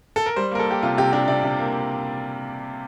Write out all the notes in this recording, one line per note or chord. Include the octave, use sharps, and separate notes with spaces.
A4
A#4
G3 C5
A#3 A#4
A4
A#3 G4
C3 F4
C3 G4
D4 G4
C3 D5
C3
A#3